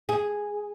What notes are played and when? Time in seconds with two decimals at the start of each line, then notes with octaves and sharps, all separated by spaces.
0.09 G#4